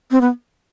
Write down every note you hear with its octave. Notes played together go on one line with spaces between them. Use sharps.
C4
B3